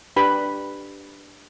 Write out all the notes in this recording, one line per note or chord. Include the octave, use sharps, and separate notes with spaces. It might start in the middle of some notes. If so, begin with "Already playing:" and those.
D4 G4 B4 B5